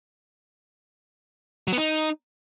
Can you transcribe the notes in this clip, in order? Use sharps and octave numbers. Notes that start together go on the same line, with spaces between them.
F#3
B3
D#4